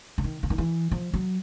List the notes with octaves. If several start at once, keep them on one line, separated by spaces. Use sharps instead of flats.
D3
D#3
D3
D#3
E3
F3
F#3